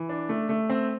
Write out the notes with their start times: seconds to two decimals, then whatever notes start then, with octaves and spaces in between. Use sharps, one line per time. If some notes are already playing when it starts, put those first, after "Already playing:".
Already playing: E3
0.09 D4
0.29 A3
0.49 A3
0.70 C4